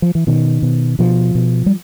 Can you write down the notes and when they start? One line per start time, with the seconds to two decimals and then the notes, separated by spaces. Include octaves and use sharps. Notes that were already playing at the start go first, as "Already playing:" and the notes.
0.02 F3
0.15 E3
0.27 B2 D#3
0.63 B2
0.99 B2 F3
1.35 B2
1.66 G3